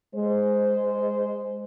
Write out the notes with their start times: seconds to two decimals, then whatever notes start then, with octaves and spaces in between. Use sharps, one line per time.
0.15 G#3 C5